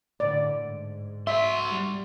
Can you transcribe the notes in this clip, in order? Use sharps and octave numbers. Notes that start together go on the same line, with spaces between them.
A2 D3 D5
G#2
F#4 E5 C6
G3